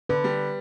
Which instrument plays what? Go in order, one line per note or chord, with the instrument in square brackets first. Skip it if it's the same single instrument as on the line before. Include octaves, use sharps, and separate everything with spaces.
[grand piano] D3 [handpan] B4
[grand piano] G3